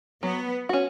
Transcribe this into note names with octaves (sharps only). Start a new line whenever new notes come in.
F#3 B3
C#4 F#4